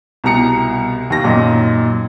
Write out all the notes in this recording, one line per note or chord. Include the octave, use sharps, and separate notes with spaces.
C2 B2 A#5 C#7
D#2 A#6
F#2 A#2 D#3 D#4